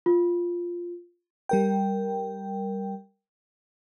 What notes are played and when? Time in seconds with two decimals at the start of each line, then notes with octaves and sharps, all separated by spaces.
0.06 F4
1.49 G3 A#4 G5